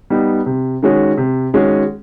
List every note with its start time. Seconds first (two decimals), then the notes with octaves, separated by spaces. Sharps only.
0.10 G3 B3 D#4
0.46 C3
0.83 D#3 G#3 C#4 F#4
1.17 C3
1.53 D#3 G#3 C#4 F#4